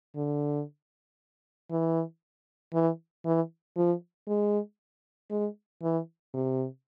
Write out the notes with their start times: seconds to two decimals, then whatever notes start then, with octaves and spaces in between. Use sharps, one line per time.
0.16 D3
1.71 E3
2.73 E3
3.25 E3
3.77 F3
4.28 G#3
5.31 G#3
5.83 E3
6.34 C3